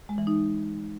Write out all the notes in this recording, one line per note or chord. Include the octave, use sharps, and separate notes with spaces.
G#3
E3
D#4